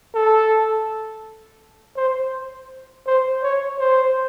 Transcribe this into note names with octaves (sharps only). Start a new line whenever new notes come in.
A4
C5
C5
C#5
C5